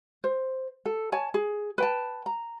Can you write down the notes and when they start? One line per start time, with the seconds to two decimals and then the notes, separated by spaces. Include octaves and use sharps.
0.24 C5
0.86 A4
1.12 C#5 G#5 A5
1.34 G#4
1.78 B4 G5 A5
2.26 A#5